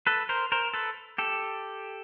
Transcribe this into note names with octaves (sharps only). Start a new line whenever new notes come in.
A4 B4
A#4 C5
A#4 C5
A4 B4
G4 A4